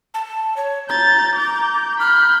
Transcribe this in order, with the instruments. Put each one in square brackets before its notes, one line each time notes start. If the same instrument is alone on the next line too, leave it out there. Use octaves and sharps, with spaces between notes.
[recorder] A5
C#5
[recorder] A#5 [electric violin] G6 A6
[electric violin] D6 G6
[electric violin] B5 G6 [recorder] F6